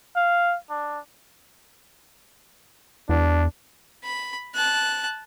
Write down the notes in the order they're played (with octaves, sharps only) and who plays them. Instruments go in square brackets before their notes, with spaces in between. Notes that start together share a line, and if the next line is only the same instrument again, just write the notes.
[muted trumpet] F5
D4
[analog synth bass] E2 [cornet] D4
[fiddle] B5
A5 F#6